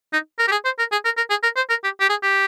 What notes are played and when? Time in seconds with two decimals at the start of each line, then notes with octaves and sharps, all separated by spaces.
0.13 D#4
0.39 A#4
0.48 G4
0.52 G#4
0.65 C5
0.79 A#4
0.92 G#4
1.05 A#4
1.17 A#4
1.30 G#4
1.43 A#4
1.56 C5
1.70 A#4
1.84 G4
2.01 G4
2.10 G#4
2.23 G4